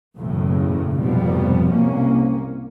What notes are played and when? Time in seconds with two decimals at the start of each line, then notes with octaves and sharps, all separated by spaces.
0.17 F#1 B1 E2 A2 C#3
0.99 F1 G#2 B2 F3 G3 B3
1.68 C2 A#3 C#4